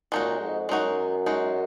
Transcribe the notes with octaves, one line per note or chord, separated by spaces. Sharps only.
F#2 A#2 G#3 D#4 F#4
F2 G#2
F#2 G#3 D#4 F#4
G#3 D#4 F#4